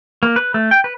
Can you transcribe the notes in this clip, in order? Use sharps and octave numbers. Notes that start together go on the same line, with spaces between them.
A#3
B4
A3
G5
B4